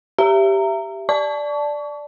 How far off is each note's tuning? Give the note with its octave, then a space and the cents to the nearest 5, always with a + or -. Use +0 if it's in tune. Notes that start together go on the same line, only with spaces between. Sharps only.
G4 +0 E5 +25 A#5 -20
D5 +0 A5 -10 C#6 +35